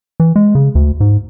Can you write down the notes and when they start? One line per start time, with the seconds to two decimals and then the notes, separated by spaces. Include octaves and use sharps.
0.20 E3
0.36 G#3
0.55 C#3
0.75 D2
1.00 G#2